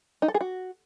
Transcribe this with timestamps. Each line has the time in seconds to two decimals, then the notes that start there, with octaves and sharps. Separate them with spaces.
0.22 D#4
0.28 A4
0.34 G#4
0.41 F#4